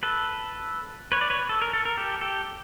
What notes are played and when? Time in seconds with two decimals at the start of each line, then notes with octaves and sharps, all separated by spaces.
0.03 A4 B4
1.12 B4 C#5
1.21 D5
1.30 B4 C#5
1.49 A4
1.62 A#4
1.73 A4
1.85 A#4
1.97 G4 A4
2.21 G4 A4